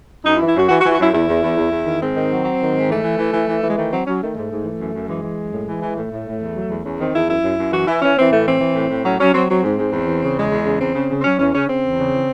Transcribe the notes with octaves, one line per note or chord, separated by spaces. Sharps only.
F#2 D#4
E4
E3
E4
F#2 F#4
E3 F#4
F#4
E3
F#4
F#2 E4
E2 E4
E2
E2
E2
E2
D#3
G#2 C4
D#3
F#3
F#3
D#3
G#2
E3 A3
E3
E3
E3
E3
E3
G#3
D#3 A3
F#3 C4
F#3 C#4
D#3 A3
G#2
G#2
E3
F#2
F#2
E3 G#3
E3
F#2
A2
E3
E3
A2 A3
A2
A2
E2
F#3
E2
E2 C#4
D#3 C4
E2 E4
F#2 E4
F#2
F#2
E3 F#4
E3 E4
E3 C#4
E3 C4
A2 A3
E3 C4
E3
A2
A2
F#3 C#4
F#3 C#4
F#3 C4
F#3 C4
G#2
G#2
E2
E3
C#3
E2 G#3
E2
C#3
E2 C4
C#3
C#3
C4
F#3 C#4
E2 C#4
C#3 C#4
C#3 C4
E2
C#3
E3